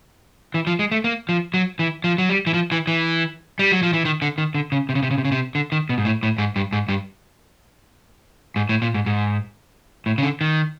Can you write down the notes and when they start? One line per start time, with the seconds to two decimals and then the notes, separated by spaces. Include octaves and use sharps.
0.54 E3
0.67 F3
0.79 G#3
0.91 A3
1.04 A#3
1.29 F3
1.54 F#3
1.79 E3
2.04 F3
2.18 F#3
2.29 G3
2.47 E3
2.54 F3
2.72 E3
2.87 E3
3.59 G3
3.72 F#3
3.83 F3
3.93 E3
4.05 D#3
4.22 D3
4.38 D#3
4.55 D3
4.72 C#3
4.89 C3
4.95 C#3
5.03 C3
5.11 C#3
5.18 C3
5.25 C#3
5.32 C3
5.55 D3
5.72 D#3
5.89 B2
5.98 G#2
6.05 A2
6.23 A2
6.38 G#2
6.56 G2
6.73 G#2
6.89 G2
8.56 G#2
8.69 A2
8.82 A#2
8.94 G#2
9.06 G#2
10.06 A2
10.18 C#3
10.23 D3
10.41 D#3